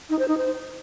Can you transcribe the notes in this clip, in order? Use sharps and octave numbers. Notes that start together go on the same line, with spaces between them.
D#4
C5
D#4
C5